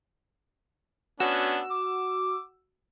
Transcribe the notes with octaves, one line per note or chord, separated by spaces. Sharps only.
B3 C#4 D4 F#4 E6
D6